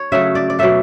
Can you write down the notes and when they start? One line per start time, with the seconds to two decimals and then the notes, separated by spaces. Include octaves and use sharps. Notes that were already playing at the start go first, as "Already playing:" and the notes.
Already playing: C#5
0.12 C#3 F#3 A3 E5
0.35 D5
0.50 D5
0.59 B2 F#3 A3 E5